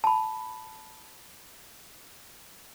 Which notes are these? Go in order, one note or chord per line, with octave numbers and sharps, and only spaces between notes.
A5 B5